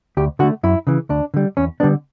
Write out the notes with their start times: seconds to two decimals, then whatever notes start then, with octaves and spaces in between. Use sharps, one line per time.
0.17 D2 G4
0.39 D3 F#4
0.43 A3
0.63 F#2 E4
0.87 C#3 E3
1.09 D2 D4
1.34 D3 G3
1.57 E2 C#4
1.80 D3 G3 B3 D4